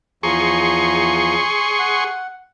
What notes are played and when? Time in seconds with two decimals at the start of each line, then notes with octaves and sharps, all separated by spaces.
0.23 E2 F3 G#4 A#5 C6 C#6
1.79 F#5